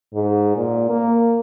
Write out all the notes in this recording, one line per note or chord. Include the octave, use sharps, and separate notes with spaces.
G#2
A#2
A#3